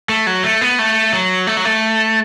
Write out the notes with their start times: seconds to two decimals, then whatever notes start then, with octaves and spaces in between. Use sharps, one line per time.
0.09 A3
0.27 F#3
0.44 A3
0.61 B3
0.79 A3
1.13 F#3
1.47 A3
1.57 F#3
1.65 A3